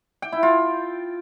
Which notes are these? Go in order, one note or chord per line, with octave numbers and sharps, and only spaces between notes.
G5
E4
F4